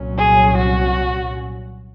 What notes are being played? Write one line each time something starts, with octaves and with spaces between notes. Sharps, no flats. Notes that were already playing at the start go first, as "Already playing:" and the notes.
Already playing: C2 A#2 F#3 C#4
G#4
F#4